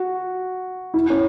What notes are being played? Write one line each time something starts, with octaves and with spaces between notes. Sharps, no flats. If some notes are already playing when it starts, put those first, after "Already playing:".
Already playing: F#4
E4
C#4